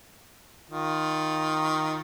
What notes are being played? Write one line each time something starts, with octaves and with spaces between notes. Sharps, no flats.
D#3 F4